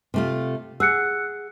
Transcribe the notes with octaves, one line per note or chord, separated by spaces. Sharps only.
C3 A3 F4
G#4 F#5 E6 F#6 C#7